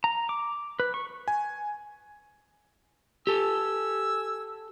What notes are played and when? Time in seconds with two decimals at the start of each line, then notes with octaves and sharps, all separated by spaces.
0.04 A#5
0.29 D6
0.80 B4
0.94 C#6
1.28 G#5
3.27 G4 A4 G#5 E6